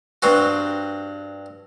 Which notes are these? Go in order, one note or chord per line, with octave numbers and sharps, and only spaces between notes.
G2 C4 F#4